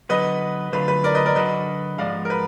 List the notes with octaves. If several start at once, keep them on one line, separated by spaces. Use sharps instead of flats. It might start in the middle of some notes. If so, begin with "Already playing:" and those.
D3 F#3 B3 B4 D#5
D2 D3 F#3 D4 F4 B4
B4
A#4 D5
B4 D#5
A#4 D5
D3 F#3 D4 F#4 B4 D#5
G#2 F3 G#3 B3 D5 F5
A#4
B4